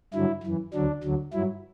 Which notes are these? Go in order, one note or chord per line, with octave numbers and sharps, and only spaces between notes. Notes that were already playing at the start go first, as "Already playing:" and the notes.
G2 D3 F#3 E4
F#2 E3
D2 D3 F#3 D4
D2 D3 F#3
G2 F#3 E4